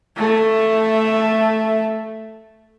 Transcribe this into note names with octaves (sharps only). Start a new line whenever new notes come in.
A3 E5